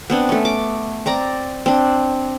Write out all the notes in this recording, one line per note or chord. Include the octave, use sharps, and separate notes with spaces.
B3 C4 D4
A3 C#4
D6
C4 D5 A#5
C4 D4